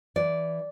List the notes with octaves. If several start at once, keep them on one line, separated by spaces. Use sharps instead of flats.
E3 D5